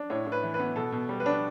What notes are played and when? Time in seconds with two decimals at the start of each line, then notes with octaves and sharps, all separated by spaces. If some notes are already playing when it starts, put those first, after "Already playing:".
Already playing: D4
0.10 A2 C#5
0.27 A2
0.32 B4
0.43 E3
0.54 B4
0.60 B3
0.76 B2 A4
0.92 B2
1.09 G3
1.20 B4
1.26 D4